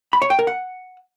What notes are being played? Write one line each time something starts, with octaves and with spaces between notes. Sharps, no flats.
B5
C#5
G5
A#4
F#5